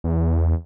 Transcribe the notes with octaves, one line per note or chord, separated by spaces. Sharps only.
E2